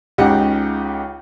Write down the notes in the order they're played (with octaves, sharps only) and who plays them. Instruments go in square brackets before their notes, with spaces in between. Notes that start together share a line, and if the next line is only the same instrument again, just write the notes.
[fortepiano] C#2 C#3 D#4 G4 F#5